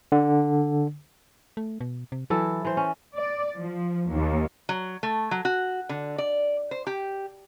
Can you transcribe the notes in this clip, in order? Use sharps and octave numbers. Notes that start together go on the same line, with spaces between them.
D3
A3
B2
C3
E3 F#3 E4 A4
E3 C5
C#4
D5
F3
D#2
F#3
A3
F#3
F#4
D3
D5
C5
G4